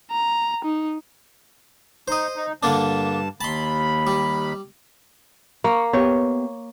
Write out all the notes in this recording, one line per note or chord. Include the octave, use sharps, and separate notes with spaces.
A#5
D#4
D#4 C5 D#5
D#4
G2 D3 A#3 D4 A5
D#2 A5 B5 C6
G3
A#3 C#6
B3 G4 C#5